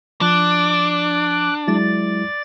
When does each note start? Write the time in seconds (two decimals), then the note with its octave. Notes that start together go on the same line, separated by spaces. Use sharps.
0.21 F3 D4 D6 F#6
1.68 F#3 G#3 E4 D5 A6